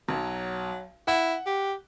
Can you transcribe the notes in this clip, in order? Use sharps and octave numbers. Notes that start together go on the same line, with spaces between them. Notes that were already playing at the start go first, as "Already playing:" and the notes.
B1 F#3
E4 F#5
G4